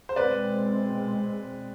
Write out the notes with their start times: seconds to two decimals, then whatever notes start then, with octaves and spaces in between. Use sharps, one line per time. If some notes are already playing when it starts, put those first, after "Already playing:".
0.09 C5
0.16 B2 G#3 C4 B4 D5